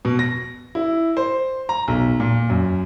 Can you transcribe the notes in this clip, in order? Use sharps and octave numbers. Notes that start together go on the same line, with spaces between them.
B2
A#6
E4
C5
A#5
B1
A#2
F#2